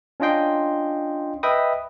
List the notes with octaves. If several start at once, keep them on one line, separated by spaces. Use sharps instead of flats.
C#4 D4 F4 D#5 G5 C6
B4 D#5 E5 G5 B5 D#6